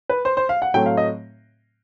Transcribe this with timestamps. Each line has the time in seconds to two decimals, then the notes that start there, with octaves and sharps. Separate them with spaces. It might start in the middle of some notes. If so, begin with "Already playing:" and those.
0.10 B4
0.25 C5
0.37 C5
0.49 F5
0.62 F#5
0.74 A2 F#3 A3 C4 G5
0.86 F5
0.97 D#5